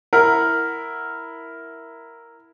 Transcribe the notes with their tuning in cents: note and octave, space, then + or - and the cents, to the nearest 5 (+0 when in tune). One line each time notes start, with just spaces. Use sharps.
E4 +0 A#4 +0 F#5 +0